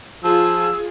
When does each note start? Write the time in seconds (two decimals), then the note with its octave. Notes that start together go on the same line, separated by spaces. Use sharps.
0.24 F3 F4 G#4 E6